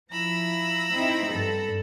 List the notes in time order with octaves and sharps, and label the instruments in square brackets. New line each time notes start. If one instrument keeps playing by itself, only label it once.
[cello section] F3 E4 [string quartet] A#5 B5 E6
[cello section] C4 D#4 E4
G2 A4